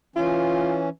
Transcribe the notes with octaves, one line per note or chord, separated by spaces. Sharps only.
E3 C#4 F4